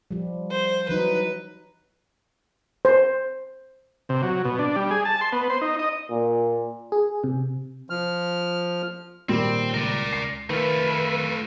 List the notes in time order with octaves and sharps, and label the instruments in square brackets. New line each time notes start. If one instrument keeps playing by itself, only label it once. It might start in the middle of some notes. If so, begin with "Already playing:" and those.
[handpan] F3 G3
[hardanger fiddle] C5
[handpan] E3 F#3 D#4 [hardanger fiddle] B4
[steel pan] C5
[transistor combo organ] C3
F#3
B2
D4
G3
G#4
A5
C6
B3
C5
D#4
D#5
[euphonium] A#2
[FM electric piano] G#4
C3
[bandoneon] F3 F6
[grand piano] A#2 D#3 G3 [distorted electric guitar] C4
[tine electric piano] C#2 [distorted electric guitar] A#4 D5
[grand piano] C7
[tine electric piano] D#3 [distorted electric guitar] A3 F4 [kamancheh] B4